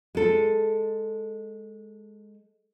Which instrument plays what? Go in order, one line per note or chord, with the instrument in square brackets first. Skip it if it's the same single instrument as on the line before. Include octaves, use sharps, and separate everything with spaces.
[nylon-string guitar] G#3 A4